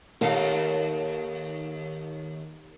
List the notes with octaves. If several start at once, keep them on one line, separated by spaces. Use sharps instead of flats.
D#2 A4 A#4 F5